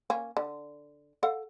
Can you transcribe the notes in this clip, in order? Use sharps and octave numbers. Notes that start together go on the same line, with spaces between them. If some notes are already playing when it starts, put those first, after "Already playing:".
A#3 C#4
D3
A4 F5 F#5